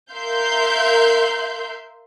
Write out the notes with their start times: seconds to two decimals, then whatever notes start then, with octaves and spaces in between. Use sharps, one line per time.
0.12 A#4 E5 F5 C6 G6